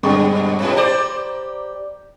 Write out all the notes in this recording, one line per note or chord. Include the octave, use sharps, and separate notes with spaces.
G2 A#2 D3 G#3 C#6
G#2 C3
G4 C5 D5 A#5 D6